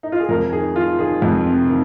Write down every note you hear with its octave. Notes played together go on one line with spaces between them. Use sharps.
D#4
F4
G#4
F2 A#4
D#3 G#4
D#3 F4
D#3 G#4
F2
C3
D#3